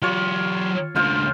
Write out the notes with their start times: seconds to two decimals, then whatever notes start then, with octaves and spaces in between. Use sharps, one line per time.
0.02 F#3 F4 G4 C#5
0.96 C#2 D4 F4 C5 F5